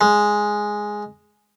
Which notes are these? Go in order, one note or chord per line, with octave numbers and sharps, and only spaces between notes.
G#3